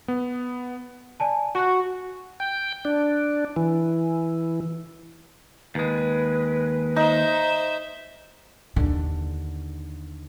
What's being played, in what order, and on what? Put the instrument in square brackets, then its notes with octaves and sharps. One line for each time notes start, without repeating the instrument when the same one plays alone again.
[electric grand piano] B3
[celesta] D5 G#5 A5
[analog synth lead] F#4 [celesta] C#6 F#6
[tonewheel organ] G5
D4
E3
[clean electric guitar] D#2 G#3 [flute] B4
[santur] D#4 [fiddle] C5 E5
[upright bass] D#2 D3